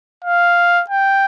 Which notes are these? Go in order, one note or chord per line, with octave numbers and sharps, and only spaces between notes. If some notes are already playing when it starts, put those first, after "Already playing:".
F5
G5